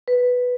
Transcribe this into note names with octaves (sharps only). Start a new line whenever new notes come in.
B4